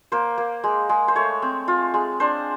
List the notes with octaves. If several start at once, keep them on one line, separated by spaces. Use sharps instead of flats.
A#3 C5
A#3
G#3
G#3
C5
A3 C#5
C4
F4
G#3
D4 C5